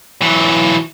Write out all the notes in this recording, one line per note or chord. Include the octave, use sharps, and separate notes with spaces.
E3 F#3